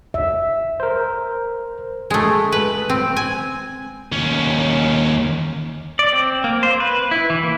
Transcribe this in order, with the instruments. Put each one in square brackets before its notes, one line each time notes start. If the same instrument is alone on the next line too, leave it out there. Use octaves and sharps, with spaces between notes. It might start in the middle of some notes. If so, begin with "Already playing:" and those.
[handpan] E5
[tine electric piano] A#4 C5
[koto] G#3 A3
B4
C4
G#5
[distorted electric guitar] D#2 C#4
[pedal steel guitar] D5
C4
A#3
C5
B4
E4
E3
A#3